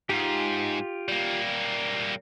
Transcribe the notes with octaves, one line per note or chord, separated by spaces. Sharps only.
G#2 F4 G4
G3 A#3